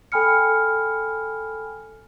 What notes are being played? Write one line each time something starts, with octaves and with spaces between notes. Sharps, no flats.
A4 G5 G#5 B5 F6 C#7